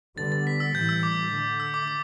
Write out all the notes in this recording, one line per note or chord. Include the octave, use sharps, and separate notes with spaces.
D3 G3 B3 A6
A6
B6
E6
A2 E3 G3 G6
E6
D6
D3 A3
E6
D6
D6